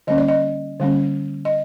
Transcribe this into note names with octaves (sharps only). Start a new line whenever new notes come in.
D3 G3 A#3 C#4 D#5
D5
D#5
D3 G3 A#3 C#4
D#5